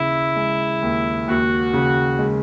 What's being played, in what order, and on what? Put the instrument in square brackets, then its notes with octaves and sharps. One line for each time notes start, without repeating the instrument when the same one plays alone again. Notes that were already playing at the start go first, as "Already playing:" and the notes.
Already playing: [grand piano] D#2 C#3 [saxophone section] E4
[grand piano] G#3
D#2
[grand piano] D#2 [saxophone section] F#4
[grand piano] C#3
G#3